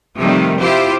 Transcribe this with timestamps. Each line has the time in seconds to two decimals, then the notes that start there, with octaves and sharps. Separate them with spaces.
0.17 C3 D#3 F3 G3 A3
0.58 E4 F4 G4 C5